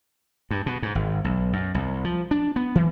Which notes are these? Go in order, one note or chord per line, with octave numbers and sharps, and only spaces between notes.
G2
B2
G#2
G#1
B1
F#2
C2
F3
D4
B3
E3